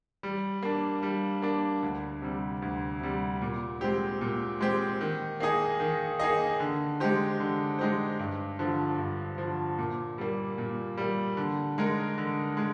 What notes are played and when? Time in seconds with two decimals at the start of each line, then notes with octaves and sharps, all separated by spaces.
0.23 G3
0.63 A#3 D4
1.03 G3
1.42 A#3 D4
1.83 D2
2.22 C3 G3
2.62 D2
3.01 C3 G3
3.42 A#2
3.81 G#3 C4 G4
4.21 A#2
4.61 G#3 C4 G4
5.01 D#3
5.40 A#3 D#4 G#4 D#5
5.80 D#3
6.20 A#3 D#4 G#4 D#5
6.60 D3
7.00 G#3 D#4 G4 C5
7.40 D3
7.79 G#3 D#4 G4 C5
8.19 G2
8.59 D3 F3
8.98 G2
9.38 D3 F3
9.78 A#2
10.18 G3 A#3
10.58 A#2
10.97 G3 A#3
11.37 D3
11.78 G#3 D#4 A#4
12.18 D3
12.57 G#3